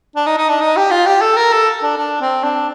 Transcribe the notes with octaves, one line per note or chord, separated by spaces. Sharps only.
D4
D#4
D#4
D4
D#4
G4
F4
G4
A4
A#4
A4
D4
D4
C4
D4